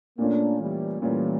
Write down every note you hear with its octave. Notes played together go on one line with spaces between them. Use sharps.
A#2 A3 A#3 C#4 D4 F4
E3 G3
A#2 E3 G3 A3 C#4 F4